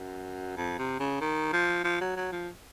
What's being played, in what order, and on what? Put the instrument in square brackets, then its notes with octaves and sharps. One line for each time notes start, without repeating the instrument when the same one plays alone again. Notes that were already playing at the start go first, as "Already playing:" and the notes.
Already playing: [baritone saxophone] F#2
F2
C3
C#3
D#3
F3
F3
F#3
F#3
F3